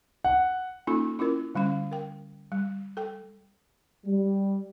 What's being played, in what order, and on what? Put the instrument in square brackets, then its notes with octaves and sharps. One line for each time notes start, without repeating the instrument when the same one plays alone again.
[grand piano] F#5
[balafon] A#3 C#4 D#4 F4 A4
C#4 E4 F4 A#4
D3 G3 C#4 F5
A#4 G5
G3
A4 G5
[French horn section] G3